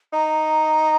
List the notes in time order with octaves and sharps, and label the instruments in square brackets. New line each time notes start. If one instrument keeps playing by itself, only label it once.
[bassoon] D#4 [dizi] A#5